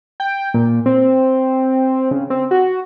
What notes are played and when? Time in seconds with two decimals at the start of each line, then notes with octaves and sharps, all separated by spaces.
0.20 G5
0.54 A#2
0.86 C4
2.11 C#3
2.30 C4
2.51 F#4